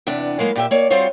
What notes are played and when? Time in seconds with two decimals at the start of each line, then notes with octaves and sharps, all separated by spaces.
0.07 E2 C3 B3 D4
0.39 F#3 G#3 A#3 B3
0.56 A#2 G4 E5
0.71 A#3 C#5 D5
0.90 G3 C4 F4 F#4 C5 C#5